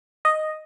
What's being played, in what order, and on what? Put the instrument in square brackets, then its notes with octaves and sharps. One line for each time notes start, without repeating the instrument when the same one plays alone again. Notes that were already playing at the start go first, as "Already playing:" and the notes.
[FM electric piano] D#5